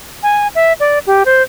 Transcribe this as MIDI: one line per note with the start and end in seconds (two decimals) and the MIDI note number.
0.23 0.48 80
0.55 0.73 76
0.80 0.99 74
1.06 1.23 67
1.25 1.43 72